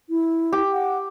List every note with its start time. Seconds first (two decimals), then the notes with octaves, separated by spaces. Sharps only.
0.09 E4
0.52 G4
0.73 F#5